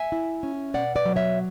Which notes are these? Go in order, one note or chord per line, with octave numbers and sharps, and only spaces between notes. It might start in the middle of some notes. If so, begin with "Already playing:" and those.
Already playing: E5 G#5
E4
C#4
B2 D5 F#5
B4 D5
F#3
C#5 E5